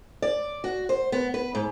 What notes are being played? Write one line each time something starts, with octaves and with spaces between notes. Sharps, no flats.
D5
F#4
C5
B3
B4
G#2